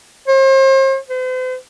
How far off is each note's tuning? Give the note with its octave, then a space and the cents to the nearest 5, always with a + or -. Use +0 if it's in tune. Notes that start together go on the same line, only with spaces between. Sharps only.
C5 +40
C5 -45